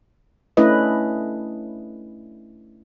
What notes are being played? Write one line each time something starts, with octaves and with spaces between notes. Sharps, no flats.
A3 C#4 D4 E4 B4 D#5